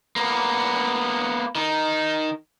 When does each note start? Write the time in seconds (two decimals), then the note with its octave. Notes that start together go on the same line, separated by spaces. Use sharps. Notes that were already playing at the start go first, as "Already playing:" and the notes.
0.16 A#3 B3
1.55 D#3 D#4